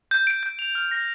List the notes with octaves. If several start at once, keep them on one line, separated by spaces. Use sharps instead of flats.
G6
D7
G6
F7
F6
A#6